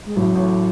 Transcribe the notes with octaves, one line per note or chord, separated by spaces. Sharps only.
G#3
A1 A2 F#3
A1 A2